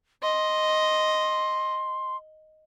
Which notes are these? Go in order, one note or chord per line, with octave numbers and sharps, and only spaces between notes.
D#5 C6